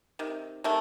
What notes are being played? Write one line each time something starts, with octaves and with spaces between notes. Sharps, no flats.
C3 D#3
C3 D#3 A3